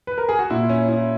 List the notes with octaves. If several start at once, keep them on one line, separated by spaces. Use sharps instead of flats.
B4
A#4
G#4
F#4
A#2 E4
C#4
E4